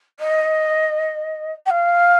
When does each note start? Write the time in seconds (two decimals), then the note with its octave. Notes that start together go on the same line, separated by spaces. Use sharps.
0.19 D#5
1.66 G5
1.70 F5